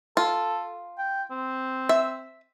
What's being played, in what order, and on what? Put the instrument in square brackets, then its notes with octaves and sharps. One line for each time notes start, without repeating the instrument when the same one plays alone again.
[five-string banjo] F4 [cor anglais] A4
[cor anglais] G5
C4
[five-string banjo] E5